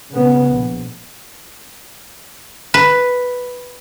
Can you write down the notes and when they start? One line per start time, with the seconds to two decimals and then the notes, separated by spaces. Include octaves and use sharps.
0.13 C#3 B3
0.48 A#1
2.74 B4